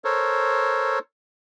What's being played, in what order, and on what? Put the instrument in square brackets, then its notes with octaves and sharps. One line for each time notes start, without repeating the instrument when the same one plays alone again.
[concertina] A4 A#4 C5 C#5